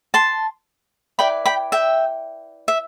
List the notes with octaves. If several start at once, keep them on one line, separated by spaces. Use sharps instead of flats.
A5 C6
E4 B4 D5 G5 B5
G5 B5
E5 G5
E5